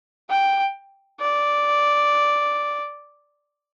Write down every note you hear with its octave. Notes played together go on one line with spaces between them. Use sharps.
G5
D5